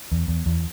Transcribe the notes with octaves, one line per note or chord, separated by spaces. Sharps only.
E2
E2
E2